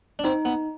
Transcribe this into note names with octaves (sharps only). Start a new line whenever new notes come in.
D4
C4 D#4
B3